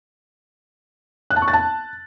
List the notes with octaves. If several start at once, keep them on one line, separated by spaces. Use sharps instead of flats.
F#6
A5
C#6
A6
A5